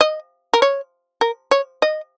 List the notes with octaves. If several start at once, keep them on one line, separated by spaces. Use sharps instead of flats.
D#5
A#4
C#5
A#4
C#5
D#5